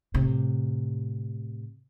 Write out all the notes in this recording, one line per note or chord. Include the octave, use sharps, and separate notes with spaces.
A2 C3